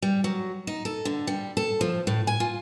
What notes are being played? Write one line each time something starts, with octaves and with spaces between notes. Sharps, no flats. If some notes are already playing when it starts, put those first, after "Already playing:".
G3
F#3
D#4
A4
D3
G3
A4
F3
A2
G#5
F4